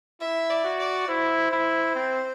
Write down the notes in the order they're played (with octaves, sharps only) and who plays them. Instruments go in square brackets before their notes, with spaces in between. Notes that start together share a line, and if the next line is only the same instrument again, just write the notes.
[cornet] E4 [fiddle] E5
[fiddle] D5
[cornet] F#4
[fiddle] D5
[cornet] E4 [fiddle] C5
[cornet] E4
C4